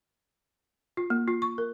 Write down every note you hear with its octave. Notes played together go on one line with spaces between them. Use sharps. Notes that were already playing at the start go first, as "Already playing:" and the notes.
F4
A#3
F4
C#6
A#4